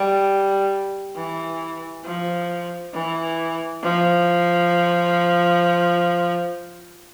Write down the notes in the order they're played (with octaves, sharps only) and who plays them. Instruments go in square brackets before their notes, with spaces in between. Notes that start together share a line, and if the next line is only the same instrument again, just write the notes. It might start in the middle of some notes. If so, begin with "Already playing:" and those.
Already playing: [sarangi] G3
E3
F3
E3
F3